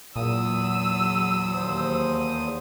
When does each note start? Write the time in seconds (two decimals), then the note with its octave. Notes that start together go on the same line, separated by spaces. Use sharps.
0.16 E2 A#2 F#3 D#6 E6
1.54 D#2 C5